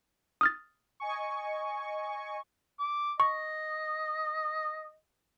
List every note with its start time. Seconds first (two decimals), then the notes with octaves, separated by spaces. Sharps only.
0.41 D#6 F6 A6
1.00 D#5 G#5 C#6
2.79 D6
3.20 D#5 C#6